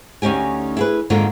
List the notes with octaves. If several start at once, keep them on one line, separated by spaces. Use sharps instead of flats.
D2 C#4 D#4 G4 G#5
E4 G#4 B4
F2 G#2 D3 D#3 A#3 F4